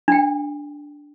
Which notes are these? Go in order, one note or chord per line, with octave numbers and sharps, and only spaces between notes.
D4 G5